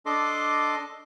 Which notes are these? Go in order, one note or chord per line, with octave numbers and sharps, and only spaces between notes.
D4 A4 D#5 C6 D6